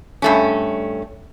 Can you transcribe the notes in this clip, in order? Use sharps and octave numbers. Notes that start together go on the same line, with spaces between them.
G2 A3 C#4